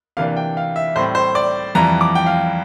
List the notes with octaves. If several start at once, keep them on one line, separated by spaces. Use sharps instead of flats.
C3 E3 A#3 D4 F5
G5
F5
E5
A2 G3 C4 C5
C5
D5
F2 E3 G3 A#5
D6
G5
F5